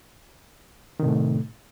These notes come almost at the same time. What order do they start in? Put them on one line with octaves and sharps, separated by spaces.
D#3 C3 A2 A3